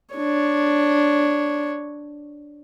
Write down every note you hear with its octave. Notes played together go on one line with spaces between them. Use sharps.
D4 C#5